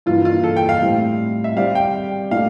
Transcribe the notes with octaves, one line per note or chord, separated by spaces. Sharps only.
G2 E3 A#3 F4
F4
A4
G5
F5
A2 G3 C4 E4
E5
G3 C4 G4 D5 F5
G5
A#2 A3 D4 G4 F5